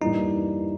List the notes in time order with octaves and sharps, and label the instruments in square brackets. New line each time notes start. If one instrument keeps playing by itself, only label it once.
[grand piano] G2 E3 G3 A#3 [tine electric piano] D#4